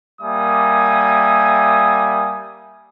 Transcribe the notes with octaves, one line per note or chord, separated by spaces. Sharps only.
G3 A#3 E5 G#5 D#6